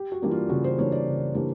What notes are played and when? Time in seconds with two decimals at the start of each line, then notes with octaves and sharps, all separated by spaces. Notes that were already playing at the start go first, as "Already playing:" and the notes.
Already playing: G4
0.12 F#4
0.22 E3 G3 A#3 D4
0.31 F4
0.49 C#3 F#4
0.64 C5
0.78 E3 G3 A#3 D4 C#5
0.92 D5
1.07 C#3
1.34 E3 G3 A#3 D4